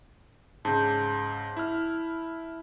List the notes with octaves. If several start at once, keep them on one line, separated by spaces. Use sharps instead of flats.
G#2 C#3 A5 G6
E4 F6